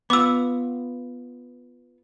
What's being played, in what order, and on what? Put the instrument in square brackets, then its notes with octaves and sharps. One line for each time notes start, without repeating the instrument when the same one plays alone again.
[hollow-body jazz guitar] B3 F4 [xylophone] D6 E6